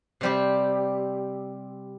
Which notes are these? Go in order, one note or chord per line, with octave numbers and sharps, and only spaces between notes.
C3 G3 C4 G4